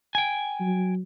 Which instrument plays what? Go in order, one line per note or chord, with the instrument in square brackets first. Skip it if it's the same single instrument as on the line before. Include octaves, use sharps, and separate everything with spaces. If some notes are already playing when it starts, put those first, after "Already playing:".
[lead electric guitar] G5 G#5
[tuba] F#3